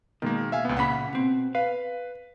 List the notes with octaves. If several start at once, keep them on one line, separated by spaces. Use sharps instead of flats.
B2 D#3 G#3 A#3
E5 F5 G#5
C#2 B3
A#2 C#3 F#5 B5 B6
B2 C4
B4 F5